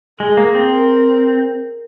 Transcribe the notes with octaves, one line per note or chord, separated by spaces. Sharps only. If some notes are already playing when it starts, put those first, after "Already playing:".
G#3 G#4
A#3
C4
A#4